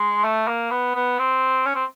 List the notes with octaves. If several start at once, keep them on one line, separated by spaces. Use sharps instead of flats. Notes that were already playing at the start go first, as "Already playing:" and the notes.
Already playing: G#3
A3
A#3
B3
B3
C4
C#4
C4